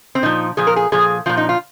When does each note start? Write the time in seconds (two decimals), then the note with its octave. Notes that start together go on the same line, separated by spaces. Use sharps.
0.15 C4
0.23 A#2 F3 D#4
0.57 A#2 F3 G#4
0.67 A#4
0.76 G#4
0.92 A#2 F3 G#4
1.26 A#2 F3 F4
1.37 D#4
1.49 F4